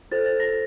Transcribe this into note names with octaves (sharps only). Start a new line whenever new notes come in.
F4 A4 C5 A6
A6
A#6